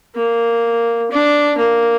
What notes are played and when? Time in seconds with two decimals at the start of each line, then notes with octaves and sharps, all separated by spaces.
0.15 A#3
1.11 D4
1.58 A#3